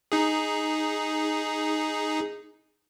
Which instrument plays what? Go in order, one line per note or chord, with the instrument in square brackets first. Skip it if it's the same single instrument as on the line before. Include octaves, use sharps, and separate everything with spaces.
[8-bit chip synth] D#4 G#4